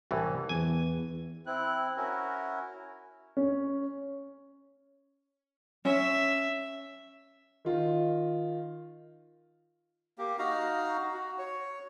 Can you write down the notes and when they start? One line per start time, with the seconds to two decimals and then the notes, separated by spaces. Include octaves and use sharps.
0.11 C2 A2 E3
0.49 E2 G#5
1.46 C4 E4 F#6
1.97 C#4 E4 F#4 A#4
3.37 C#4
5.85 C#4 E5
7.65 D#3 F4
10.18 A#3 G4
10.39 D#4 F#4 F5 A#5
11.14 F#4
11.39 C#5